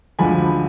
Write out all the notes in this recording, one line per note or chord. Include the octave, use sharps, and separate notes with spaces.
D2 D3 F3 G#3 G#5 B5